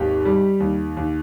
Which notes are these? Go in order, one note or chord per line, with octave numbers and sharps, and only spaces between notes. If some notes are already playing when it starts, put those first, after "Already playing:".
Already playing: G#1 D#2 G4
G3
D#2
D#2